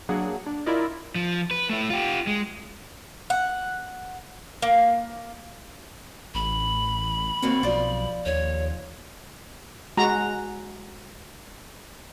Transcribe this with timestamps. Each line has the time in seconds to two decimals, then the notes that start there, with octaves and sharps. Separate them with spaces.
0.09 F#3 A#3 D4 G#4 F#5
0.46 D4
0.66 E4 F4 A#4 D5 D#5
1.15 F3
1.51 B4
1.69 A3 E4
1.90 F4 G4
2.27 G#3
3.30 F#5
4.62 A#3
6.35 A1 B5
7.42 D#2 A#3 C4 F#4
7.63 B1 F3 D5
8.26 D#2 C#5
9.97 G#3 F#4 A#5